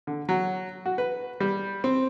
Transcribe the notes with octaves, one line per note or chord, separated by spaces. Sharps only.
D3
F#3
F#4
B4
G3
C4